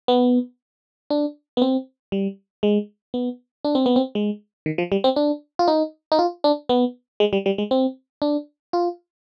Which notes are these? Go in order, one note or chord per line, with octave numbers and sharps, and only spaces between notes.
B3
D4
B3
C4
G3
G#3
B3
D4
C4
B3
C4
G#3
D#3
F3
G3
C4
D4
F4
D#4
D#4
F4
D4
B3
G#3
G3
G3
G#3
C4
D4
F4